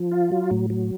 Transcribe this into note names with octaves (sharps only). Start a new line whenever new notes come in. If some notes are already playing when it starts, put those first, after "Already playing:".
Already playing: F3
F4
F#3
A2
F#3